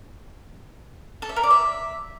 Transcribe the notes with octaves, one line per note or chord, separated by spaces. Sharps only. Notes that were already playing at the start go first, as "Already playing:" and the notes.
A4
E5
A#4
D5
E5